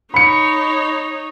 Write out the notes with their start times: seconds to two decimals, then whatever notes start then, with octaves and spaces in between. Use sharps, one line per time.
0.14 D#4 C#5 B5 C#7